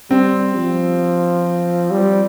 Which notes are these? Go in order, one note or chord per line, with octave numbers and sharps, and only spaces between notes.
G3 C4
F3
G3